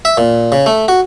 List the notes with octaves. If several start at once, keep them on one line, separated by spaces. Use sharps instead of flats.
E5
A#2
C#3
A3
F#4